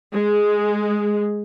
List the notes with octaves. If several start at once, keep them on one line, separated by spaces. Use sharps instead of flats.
G#3